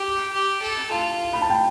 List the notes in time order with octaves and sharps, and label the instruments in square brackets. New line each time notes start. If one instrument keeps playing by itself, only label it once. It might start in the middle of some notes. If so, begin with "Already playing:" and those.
Already playing: [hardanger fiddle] G4
G4
A4
[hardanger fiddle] F4 [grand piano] A5
[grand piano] B5
A5
G5